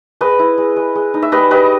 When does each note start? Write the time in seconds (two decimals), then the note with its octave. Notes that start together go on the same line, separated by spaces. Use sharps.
0.21 G#3 B4 D#5
0.39 E4
0.58 G#3
0.76 G#3
0.95 G#3
1.14 D#4
1.22 E5
1.32 G3 B4 D#5
1.51 G3 B4 D#5